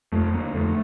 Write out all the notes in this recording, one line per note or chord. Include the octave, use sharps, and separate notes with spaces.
F2 A3
D3 A#3
F2 A3